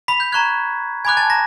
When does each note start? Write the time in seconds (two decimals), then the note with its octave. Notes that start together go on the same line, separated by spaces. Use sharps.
0.08 B5 B6
0.20 G6
0.32 A#5 C#6 F#6 G#6
1.05 G#5 B5 D6 F#6 G#6
1.17 A5 A6
1.30 A#5 A#6